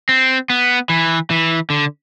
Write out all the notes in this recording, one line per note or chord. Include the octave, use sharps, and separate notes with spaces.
C4
B3
E3
E3
D3